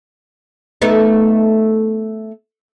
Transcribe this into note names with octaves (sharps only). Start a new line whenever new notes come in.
A3 B3 D#4